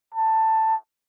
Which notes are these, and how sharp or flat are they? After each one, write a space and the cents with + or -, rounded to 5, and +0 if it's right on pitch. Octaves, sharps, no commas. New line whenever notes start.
A5 +10